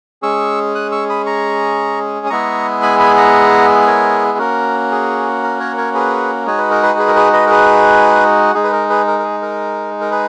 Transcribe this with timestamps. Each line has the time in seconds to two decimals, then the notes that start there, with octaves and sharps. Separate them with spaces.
0.22 G#3 C#4 G#4 C#6 E6
0.75 D#6 F#6
0.92 C#6 E6
1.09 B5 D#6
1.26 A#5 C#6
2.26 D#6
2.30 G#3 B3 E4 G#4 A#5 C#6
2.82 G#5 B5
3.00 G#5 B5
3.17 F#5 A#5
3.87 A#4 C#5
4.38 A#3 C#4 F#4 A#4
4.91 G#4
5.43 A#4
5.60 A#4 C#5
5.78 A#4 C#5
5.95 G#4 B4
6.46 G#3 D#4 F#4 C#5
6.58 B4
6.71 A#4
6.82 G#4 B4
6.99 G#4 B4
7.08 A#4
7.16 G#4 B4
7.33 B4 D#5
7.46 A#4
7.50 G#4 B4
8.54 G#3 D#4 G#4
8.64 B4
8.72 A#4
8.90 G#4 B4
9.07 A#4
9.19 A#4
9.24 G#4
9.42 A#4
10.01 A#4
10.11 G#4 B4